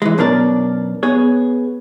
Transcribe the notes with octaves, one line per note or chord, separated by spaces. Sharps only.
E3 G#3
F#2 B2 D4 A#4 D5
B3 G#4 C#5